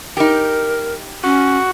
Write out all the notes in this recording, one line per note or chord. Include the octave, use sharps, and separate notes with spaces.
D#4 G4 A#4
C#4 F#4